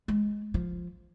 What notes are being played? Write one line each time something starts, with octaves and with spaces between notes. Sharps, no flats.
G#3
F3